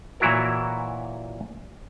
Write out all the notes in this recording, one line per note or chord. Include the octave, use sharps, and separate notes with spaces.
A#2 E3 F#3 E4 F#4 A#4